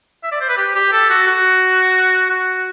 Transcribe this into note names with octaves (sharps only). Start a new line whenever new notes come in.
E5
D5
C5
B4
G4
G4
A4
F#4
F#4
F#4